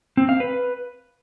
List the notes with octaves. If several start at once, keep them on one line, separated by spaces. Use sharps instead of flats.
C4
F5
B4